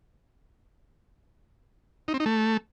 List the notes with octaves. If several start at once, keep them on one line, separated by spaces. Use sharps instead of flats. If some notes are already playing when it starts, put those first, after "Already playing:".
D#4
C4
D#4
A3